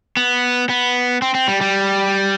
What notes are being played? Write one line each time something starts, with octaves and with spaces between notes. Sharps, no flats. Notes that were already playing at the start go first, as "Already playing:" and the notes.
B3
B3
C4
C4
G3
G3